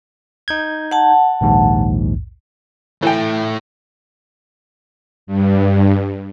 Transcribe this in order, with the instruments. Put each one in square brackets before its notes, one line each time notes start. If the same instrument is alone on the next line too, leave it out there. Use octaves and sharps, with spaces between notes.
[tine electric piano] D#4 G6 G#6
[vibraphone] F#5 A5
[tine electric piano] A#1 D#2 G#2
[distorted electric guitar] A2 A3 [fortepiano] E3 G5
[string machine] G2